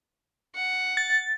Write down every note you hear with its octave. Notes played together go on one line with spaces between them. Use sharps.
F#5
A6